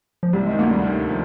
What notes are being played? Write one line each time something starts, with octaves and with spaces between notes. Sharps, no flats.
F3
C2 C3 G3
D#3 G#3
D2 D3 A#3
G3
D#2 D#3
F3